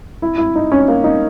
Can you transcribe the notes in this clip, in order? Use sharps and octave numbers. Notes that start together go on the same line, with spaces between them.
E4
E4
D#4
C#4
A#3
D#4